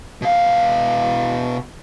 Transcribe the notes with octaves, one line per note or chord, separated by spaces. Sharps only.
B2 F5